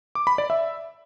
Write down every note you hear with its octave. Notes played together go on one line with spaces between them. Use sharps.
D6
B5
D5
E5